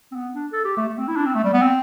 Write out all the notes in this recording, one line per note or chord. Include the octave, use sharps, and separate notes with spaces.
C4
B3
D4
A4
G4
A3
A3
C4
E4
D4
C4
A3
G3
B3
C4